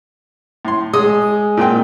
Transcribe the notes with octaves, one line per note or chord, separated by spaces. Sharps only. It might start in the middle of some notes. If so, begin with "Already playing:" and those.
A2 C6
G#3 D#6
A#2 C4 G5